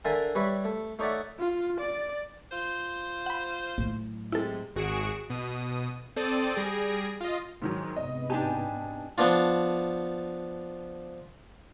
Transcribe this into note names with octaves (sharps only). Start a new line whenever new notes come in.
D3 A#4 E5 F5 G#5 A5
G3 B4 C#5 E5
A3
A3 D#4 C#5 D5 E5 F#5
F4
D5
F4 C5
F#5 B5
A#1 A2 F#3
C3 G#3 E4 A4
G#1 F#4 G#4 C#6 D7 E7
B2 D#6
C4 A4 D5 D#6 A6
G3 G#4 A#6 D7
F4 D#5
G#2 D#3 F#3
G#2 C3 B3 D#5
D4 D#4 G4 G#5 A5
F3 B3 D4 F4